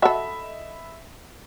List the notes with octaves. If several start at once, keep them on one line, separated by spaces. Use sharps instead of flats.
F#4 A4 D#5 E5 B5